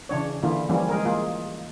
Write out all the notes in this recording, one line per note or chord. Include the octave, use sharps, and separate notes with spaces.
C#3 E3 D4 C#5
D3 E3 A#3 E4 F4
E3 F3 G3 A#3 C#4
G#3 G#4 A#4
E3 G#3 A#3 F4